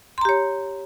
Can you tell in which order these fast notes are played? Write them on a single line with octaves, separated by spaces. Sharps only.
C6 A#5 G4 C#5